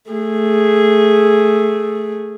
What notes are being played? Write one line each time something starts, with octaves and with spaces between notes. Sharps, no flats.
A3 G#4